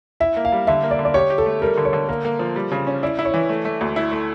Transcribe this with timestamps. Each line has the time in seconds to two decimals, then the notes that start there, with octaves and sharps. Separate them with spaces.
0.20 E4 E5
0.36 A#3
0.45 F5
0.52 G3
0.67 D3 E5
0.83 A#3
0.91 D5
0.99 D3
1.05 D5
1.14 G4 C#5
1.30 G4
1.38 A4
1.46 A3
1.62 G3 A#4
1.78 D3
1.85 C#5
1.93 D3
2.08 A#3 A#4
2.25 A#3
2.39 F3
2.56 G3
2.72 C#3
2.87 C#4
3.03 E4 D5
3.19 E4
3.25 C#5
3.34 E3
3.49 A3
3.65 A3
3.81 D2
3.96 E4
4.12 A3